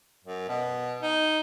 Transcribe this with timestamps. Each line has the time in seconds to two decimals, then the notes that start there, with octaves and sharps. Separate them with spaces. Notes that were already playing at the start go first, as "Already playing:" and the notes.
0.24 F#2
0.48 B2
1.02 D#4